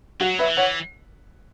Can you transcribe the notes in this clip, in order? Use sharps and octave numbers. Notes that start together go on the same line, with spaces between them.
F#3 F#4
B4 E5
E3
C#5 F#5